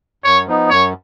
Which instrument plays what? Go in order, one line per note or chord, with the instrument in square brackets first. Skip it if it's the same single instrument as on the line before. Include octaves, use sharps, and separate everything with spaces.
[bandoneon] F#2 [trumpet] C#5
[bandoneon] F3 B3 D#4
[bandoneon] F#2 [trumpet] C#5